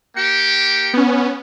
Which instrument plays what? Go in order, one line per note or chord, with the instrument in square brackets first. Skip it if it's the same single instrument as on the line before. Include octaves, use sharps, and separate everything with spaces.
[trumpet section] A#3 G4 G5 [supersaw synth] C#7
[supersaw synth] B3 C#4